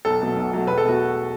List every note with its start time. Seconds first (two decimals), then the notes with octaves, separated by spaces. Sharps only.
0.05 B1 A4
0.21 B2 F#3 A3
0.37 B1
0.52 B2 F#3 A3
0.67 E1 B4
0.78 A4
0.84 B2 A3 F#4